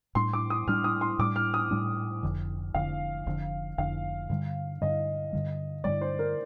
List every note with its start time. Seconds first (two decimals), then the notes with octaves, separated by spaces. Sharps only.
0.15 A2 G3 D4 C6
0.33 D6
0.50 D#6
0.67 A2 G3 D4 F6
0.84 D#6
1.01 C6
1.19 A2 G3 D4 D6
1.36 F6
1.54 D#6
1.71 A2 G3 D4
2.23 F1 F2 D3
2.74 F1 F2 D3 F5
3.26 F1 F2 D3
3.78 F1 F2 D3 F5
4.30 G2 D3 G3
4.81 G2 D3 G3 D#5
5.33 G2 D3 G3
5.84 G2 D3 G3 D5
6.01 C5
6.19 A#4